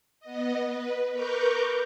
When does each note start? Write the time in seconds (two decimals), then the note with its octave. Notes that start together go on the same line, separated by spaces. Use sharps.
0.20 B3 D#5
0.66 B4
1.11 A#4 B4 A#5 C#6 D6 G6